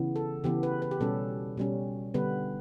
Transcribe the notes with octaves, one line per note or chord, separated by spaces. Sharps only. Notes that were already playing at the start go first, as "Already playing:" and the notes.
Already playing: C#3 E3 B3
A4
C#3 E3 B3 G4
B4
B4
G4
B2 G3 C#4 A4
B2 G3 C#4
D3 G3 B3 B4